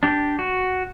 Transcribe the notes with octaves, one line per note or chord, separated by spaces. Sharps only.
D4 G4
F#4